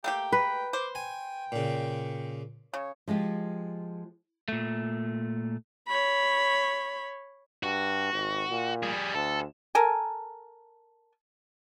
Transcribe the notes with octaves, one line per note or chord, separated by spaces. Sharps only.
A3 A#3 G4 G5
B4
C5 D6
G5 G#5
A#2 C#3
C#3 C#5
F3 G#3 F4 G4
A#2 A3
C#5 B5
G2 F#4
G#1
A#2
G3 G#4
D2 A4
A4 A#4 G#5